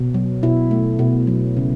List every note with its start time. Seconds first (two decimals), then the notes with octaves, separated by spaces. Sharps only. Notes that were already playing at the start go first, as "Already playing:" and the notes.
Already playing: B2
0.14 F#3
0.43 B2 E4
0.71 A3
0.99 B2
1.27 F#3
1.57 C#3